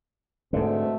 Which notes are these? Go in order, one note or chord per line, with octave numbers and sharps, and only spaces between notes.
G#2 B2 D3 A3 C4